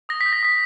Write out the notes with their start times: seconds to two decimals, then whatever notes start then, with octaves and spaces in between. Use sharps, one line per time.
0.09 D#6 A#6
0.21 B6
0.26 G6
0.33 A#6
0.43 D#6 B6